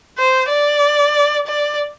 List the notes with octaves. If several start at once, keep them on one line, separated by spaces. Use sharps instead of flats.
C5
D5
D5